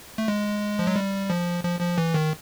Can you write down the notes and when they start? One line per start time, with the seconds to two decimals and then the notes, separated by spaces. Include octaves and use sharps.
0.18 A3
0.28 G#3
0.79 F3
0.87 F#3
0.96 G3
1.30 F3
1.64 F3
1.80 F3
1.98 E3
2.14 D#3